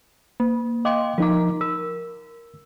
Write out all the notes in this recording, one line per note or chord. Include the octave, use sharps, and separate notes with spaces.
A#3
D#5 F5 G5 C6 D6
F3 D#4 A#4 A#5 D6
A#4 E6